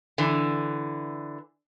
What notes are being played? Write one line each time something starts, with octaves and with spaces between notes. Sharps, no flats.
D3 E3